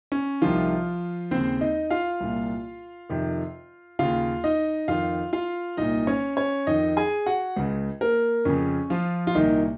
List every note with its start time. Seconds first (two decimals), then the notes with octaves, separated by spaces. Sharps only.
0.12 C#4
0.41 C2 C3 D#3 F3 F4
1.31 D#2 C#3 C4 C5
1.61 D#4 D#5
1.91 F4 F5
2.20 C2 A#2
3.09 F2 C3 D#3
3.99 D#2 C#3 F4 F5
4.44 D#4 D#5
4.88 F2 D#3 F4 F5
5.33 F4 F5
5.77 C2 A#2 D#4 D#5
6.07 C#4 C#5
6.37 C#4 C#5
6.67 F2 D#3 D#4 D#5
6.97 G#4 G#5
7.26 F#4 F#5
7.57 C#2 C#3
8.01 A#3 A#4
8.45 F2 C#3 C#4
8.90 F3 F4
9.27 F4
9.35 C2 A#2 D#3 D#4